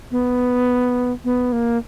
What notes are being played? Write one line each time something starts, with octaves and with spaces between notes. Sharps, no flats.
B3
B3
A#3